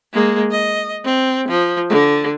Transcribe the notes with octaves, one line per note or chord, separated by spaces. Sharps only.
G#3 A#3
D#5
C4
F3
D3